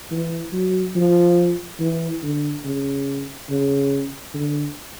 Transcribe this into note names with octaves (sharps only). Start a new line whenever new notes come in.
E3
F#3
F3
E3
D3
C#3
C#3
D3